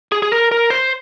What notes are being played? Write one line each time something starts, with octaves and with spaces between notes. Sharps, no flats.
G#4
G#4
A#4
A#4
C5